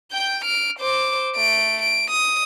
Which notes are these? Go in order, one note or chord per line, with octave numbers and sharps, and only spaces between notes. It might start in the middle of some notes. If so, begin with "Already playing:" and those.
G5 G6
F6 D7
C5 D6
A3 D7
D7
D#6